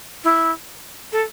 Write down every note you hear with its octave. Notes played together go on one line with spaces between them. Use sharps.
E4
A4